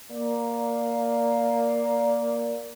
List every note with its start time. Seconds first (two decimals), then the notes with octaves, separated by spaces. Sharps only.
0.11 A#3 D5